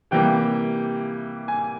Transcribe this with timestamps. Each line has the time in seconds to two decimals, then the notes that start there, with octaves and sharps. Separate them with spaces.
0.11 C3 E3 G3 A#3 G5
1.48 G#5